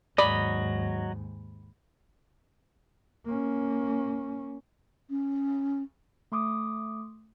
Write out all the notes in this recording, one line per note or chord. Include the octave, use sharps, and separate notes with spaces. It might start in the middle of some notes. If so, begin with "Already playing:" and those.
D#2 G#2 F#3 D5 D#5 B5 D#6
A#3 C#4
C#4
A3 C6 D6 D#6